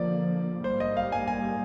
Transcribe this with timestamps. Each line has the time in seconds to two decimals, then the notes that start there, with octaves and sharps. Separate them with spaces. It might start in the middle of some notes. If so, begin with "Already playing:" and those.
Already playing: D3 F3 A#3 D5
0.64 G#2 G3 A#3 C5
0.80 D#5
0.97 F5
1.12 G#5
1.28 G#5